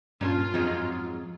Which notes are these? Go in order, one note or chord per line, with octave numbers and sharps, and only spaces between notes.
G2 A#2 C#4 F4 A5
F2 G#2 F#3 G#3